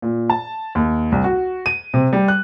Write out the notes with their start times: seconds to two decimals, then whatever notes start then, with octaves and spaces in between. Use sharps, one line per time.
0.02 A#2
0.30 A5
0.75 D#2
1.12 C2
1.24 F#4
1.66 D#7
1.94 C3
2.13 G3
2.28 F#6